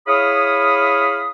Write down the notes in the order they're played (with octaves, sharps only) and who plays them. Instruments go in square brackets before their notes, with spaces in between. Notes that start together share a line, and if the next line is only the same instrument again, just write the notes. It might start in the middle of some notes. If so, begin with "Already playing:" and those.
[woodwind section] E4 G#4 C#5 F5 B5 D#6